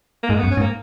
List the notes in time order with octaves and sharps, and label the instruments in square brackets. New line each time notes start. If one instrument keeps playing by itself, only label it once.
[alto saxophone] A#3
[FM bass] G#2 [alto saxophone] G#3
[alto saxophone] A#3
B3
[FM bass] F#2
[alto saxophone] C#4
[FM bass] G#2
[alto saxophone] A#3